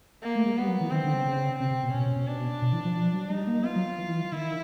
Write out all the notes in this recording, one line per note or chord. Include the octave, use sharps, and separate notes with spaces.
A#3
A3
G#3
G3 B3
F#3
E3
D#3 C4
D3
C#3
C#3
C3 C4
C3
B2
B2 C#4
B2
B2
D4
B2
E3
F3
F3
F#3
G3 D#4
A#3
B3 F4
F#3
E3
D#3 E4